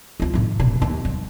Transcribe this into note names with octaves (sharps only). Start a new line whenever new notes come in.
D2 F4
A2 D#3
D#1 B2
D#2 B3
G2